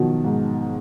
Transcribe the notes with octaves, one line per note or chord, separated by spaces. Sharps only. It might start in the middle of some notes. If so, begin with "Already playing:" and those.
Already playing: B2 D#3 F3 F#3
G#2